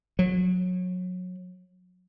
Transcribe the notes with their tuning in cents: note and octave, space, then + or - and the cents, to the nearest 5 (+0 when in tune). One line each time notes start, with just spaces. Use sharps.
F#3 -25